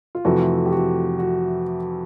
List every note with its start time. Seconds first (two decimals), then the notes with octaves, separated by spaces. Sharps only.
0.15 F4
0.25 F2 C3 E3 A3 F#4
0.66 G4
0.72 F#4
1.19 F#4